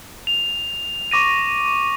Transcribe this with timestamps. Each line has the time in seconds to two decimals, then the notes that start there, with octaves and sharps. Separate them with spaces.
0.27 F7
1.11 C#6 D6 A#6 D#7